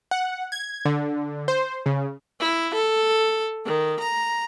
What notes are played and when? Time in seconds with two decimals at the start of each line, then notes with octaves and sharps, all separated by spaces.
0.11 F#5
0.52 G#6
0.85 D3
1.48 C5
1.86 C#3
2.40 E4
2.74 A4
3.65 D#3
3.99 A#5